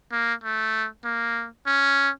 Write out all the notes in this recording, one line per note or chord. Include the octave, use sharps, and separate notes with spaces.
A#3
A3
A#3
C#4